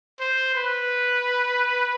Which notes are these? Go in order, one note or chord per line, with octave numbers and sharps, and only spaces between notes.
C5
B4